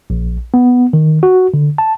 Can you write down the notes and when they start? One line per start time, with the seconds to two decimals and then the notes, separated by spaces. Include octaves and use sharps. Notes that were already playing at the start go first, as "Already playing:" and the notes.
0.10 A#1
0.54 B3
0.93 D#3
1.23 F#4
1.54 D3
1.78 A5